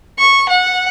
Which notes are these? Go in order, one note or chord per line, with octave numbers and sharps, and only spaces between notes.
C#6
F#5